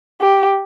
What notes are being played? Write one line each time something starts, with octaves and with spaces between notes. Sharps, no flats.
G4